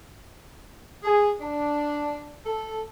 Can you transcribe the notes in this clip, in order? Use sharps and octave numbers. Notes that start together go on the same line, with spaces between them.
G#4
D4
A4